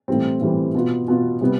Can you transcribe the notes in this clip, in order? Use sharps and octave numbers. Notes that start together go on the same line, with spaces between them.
A2 E3 G3 C4
A2 E3 G3 C4
B2 B3 F4
B2 B3 F4
C3 G3 B3